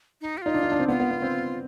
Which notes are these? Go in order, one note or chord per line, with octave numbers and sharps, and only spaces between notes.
D#4
G4
D#4 F4
D4
D#4
D4
C4
B3 F4
B3
B3
C4